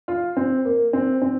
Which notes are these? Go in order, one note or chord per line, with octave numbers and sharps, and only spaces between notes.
F4
C4
A#3
C4
C4